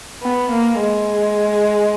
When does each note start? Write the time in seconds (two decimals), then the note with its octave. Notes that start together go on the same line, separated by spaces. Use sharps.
0.22 B3
0.51 A#3
0.80 G#3